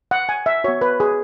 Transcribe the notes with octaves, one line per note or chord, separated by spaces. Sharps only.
F#5
G#5
E5
B3 F#4 C#5
B4
G#4